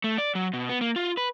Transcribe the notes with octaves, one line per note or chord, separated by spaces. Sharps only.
A3
D5
F#3
B2
B3
A#3
F4
B4